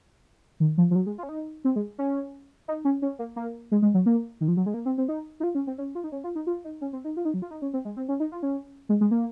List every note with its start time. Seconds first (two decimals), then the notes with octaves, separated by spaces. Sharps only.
0.60 D#3
0.78 F3
0.91 F3
0.95 F#3
1.06 G#3
1.18 F4
1.23 C#4
1.29 D#4
1.65 C4
1.76 G#3
1.98 C#4
2.68 D#4
2.85 C#4
3.02 C#4
3.19 A#3
3.36 A#3
3.72 G#3
3.82 G#3
3.94 F#3
4.06 A#3
4.41 D#3
4.48 F3
4.57 F#3
4.66 G#3
4.74 A#3
4.86 C4
4.98 C4
5.08 D#4
5.40 D#4
5.43 F4
5.55 C#4
5.67 C4
5.78 C#4
5.95 F4
6.04 D#4
6.12 C#4
6.24 F4
6.35 D#4
6.47 F4
6.64 D#4
6.81 C#4
6.93 C4
7.04 D#4
7.17 F4
7.25 D#4
7.34 F#3
7.42 F4
7.51 D#4
7.62 C#4
7.73 C4
7.85 G#3
7.97 C4
8.09 C#4
8.20 D#4
8.32 F4
8.43 C#4
8.89 G#3
9.01 G#3
9.11 A#3